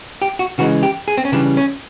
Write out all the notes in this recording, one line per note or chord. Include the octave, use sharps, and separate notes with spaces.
G4
F#4
C#3 E3 G#3 F#4
G4
G#4
C4
C#4
C#3 E3 G3 D4
C#4